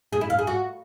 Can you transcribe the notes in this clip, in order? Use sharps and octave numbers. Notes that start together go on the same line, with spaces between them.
G#4
E4
F5
G#4
F#4